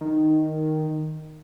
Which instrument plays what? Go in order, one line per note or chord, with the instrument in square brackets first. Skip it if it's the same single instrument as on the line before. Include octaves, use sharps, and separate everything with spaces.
[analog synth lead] D#3